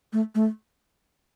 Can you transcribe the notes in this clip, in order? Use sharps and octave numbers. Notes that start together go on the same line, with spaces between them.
A3
A3